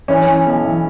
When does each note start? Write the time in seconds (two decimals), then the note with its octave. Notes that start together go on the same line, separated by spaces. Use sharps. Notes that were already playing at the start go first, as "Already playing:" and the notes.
0.08 E3 C#4
0.27 E3
0.46 B1
0.65 E3